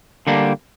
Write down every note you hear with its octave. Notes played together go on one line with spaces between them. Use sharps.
D3 G3 A#3 D4